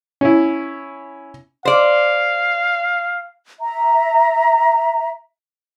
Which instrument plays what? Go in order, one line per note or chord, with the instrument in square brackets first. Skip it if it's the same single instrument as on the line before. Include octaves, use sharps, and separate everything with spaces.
[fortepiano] C#4 E4
[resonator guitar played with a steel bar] C5 D5 [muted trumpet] F5
[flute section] E5 A#5